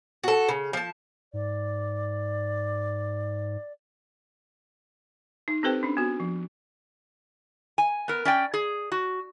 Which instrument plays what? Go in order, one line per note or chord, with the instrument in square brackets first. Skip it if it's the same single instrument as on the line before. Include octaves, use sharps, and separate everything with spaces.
[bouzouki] F#4 A4
C#3
F3 A5
[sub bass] G#2 [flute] D5
[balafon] D#4
C4 G4 A4 B4 C5 G5
C#4 D4
B3 F#4
F3
[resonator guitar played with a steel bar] G#5
B3 A#4
C#4 D5 G5
G#4
F#4